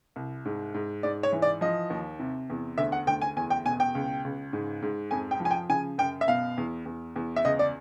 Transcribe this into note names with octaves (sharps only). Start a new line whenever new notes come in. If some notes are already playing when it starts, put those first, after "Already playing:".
C2
G#2
G#2
G#2 D5
C#5
E3
D5
F3 D#5
D#2
C3
E2
D2 E5
F#5
D2 G5
G#5
E2 G#5
G5
B2 G#5
G5
C#2
C#2
G#2
G#2
F2 G#5
G5
F3
G#5
G5
C#3 G#5
F#2 G5
E5
B2 F5
E2
E2
E2
E5
C#2 D#5
D5